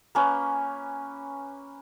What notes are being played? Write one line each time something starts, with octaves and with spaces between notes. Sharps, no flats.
A#3 C#4 B4